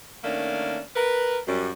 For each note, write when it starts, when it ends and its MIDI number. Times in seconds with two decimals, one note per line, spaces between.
0.24 0.80 51
0.24 0.80 57
0.24 0.80 58
0.24 0.80 61
0.24 0.80 62
0.96 1.38 70
0.96 1.38 71
1.48 1.70 42
1.48 1.70 55